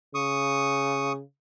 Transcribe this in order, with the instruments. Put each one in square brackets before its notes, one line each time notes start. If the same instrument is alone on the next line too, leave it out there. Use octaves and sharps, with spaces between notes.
[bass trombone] C#3 [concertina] C#6 D#6